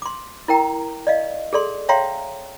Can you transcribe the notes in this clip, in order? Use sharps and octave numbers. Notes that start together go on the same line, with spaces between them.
C6 D6
E4 A#4 G5 A#5
D5 D#5 F5
G#4 A4 D5 C6
C#5 E5 F5 G5 A#5 C6